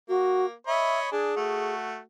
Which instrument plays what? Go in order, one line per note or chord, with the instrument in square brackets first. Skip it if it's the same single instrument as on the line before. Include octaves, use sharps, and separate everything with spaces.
[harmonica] A#3 [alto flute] F#4
[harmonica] C#5 D#5 B5 [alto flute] E5
[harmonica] D4 G#5 [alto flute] G#4
[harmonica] A3 F#4